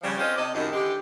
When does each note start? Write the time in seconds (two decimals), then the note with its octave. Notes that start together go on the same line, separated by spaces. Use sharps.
0.02 C#3 F3 G3
0.18 C4 C#4 F4 A4 C5 D#5
0.37 C3 A4 D5 D#5
0.54 F#2 A2 C3 D#3
0.73 D3 E3 G#3 G4